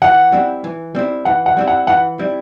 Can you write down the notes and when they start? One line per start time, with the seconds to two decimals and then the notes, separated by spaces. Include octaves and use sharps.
0.02 E3 F#5
0.32 G3 C4 E4
0.64 E3
0.95 G3 C4 E4
1.25 E3 F#5
1.46 F#5
1.57 G3 C4 E4
1.68 F#5
1.87 E3 F#5
2.19 G3 C4 E4